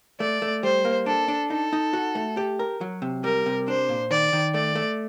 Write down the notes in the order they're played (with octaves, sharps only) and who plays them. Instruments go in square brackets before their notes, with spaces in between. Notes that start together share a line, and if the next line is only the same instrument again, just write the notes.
[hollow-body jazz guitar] A3 [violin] D5
[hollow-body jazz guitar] A3
[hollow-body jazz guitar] G3 [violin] C5
[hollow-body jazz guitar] A#3
[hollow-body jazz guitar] D4 [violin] A4
[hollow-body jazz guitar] D4
[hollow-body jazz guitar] D#4 [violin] A4
[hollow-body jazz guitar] D#4
F#4
A3
G4
A#4
F#3
C3
[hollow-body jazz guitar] G3 [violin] A#4
[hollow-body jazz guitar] C3
[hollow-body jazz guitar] D4 [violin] C5
[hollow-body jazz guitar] A#2
[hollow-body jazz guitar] D#3 [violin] D5
[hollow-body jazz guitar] D#3
[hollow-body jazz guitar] A3 [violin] D5
[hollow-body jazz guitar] A3